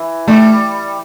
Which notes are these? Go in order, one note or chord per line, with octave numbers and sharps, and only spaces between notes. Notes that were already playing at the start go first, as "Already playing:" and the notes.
Already playing: E3
G3 A3